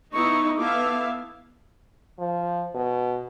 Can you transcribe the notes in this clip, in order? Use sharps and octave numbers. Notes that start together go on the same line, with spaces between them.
B3 D#4 E4 C#6
B3 E4 A4 E5 F5 D6
F3
B2